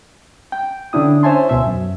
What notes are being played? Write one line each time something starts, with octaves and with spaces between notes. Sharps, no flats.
G5
D3 C#4 D4 E4 D#6
C5 C#5 E5 G#5 A5 C6
D2 B2 E5
F#2